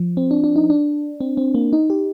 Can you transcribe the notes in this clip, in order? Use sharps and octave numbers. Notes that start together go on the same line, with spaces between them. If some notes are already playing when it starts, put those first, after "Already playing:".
Already playing: F3
C4
D4
D4
D#4
D4
C4
C4
A#3
D#4
G4